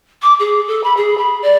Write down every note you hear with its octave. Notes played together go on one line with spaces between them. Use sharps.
D6
G#4
A4
B5
G#4
B5
D5